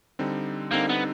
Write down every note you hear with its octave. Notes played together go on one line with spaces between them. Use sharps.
D3 G3 C4 D#4
D3 G3 A#3 C4 D#4
B3